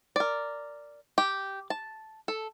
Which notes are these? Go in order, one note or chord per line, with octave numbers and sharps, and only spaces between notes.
A#4 D5
G4
A5
A4